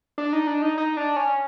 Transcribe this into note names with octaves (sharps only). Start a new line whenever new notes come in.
D4
D#4
D4
D#4
D#4
D4
C#4